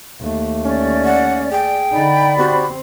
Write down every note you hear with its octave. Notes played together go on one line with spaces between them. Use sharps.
D#2 A3
C#4 D5
F#5
G#4 G5
D3 D#4 D5 B5
C4 F#4 G4